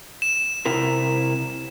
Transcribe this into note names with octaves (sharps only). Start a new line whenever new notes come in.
E7
C3 E4 A#4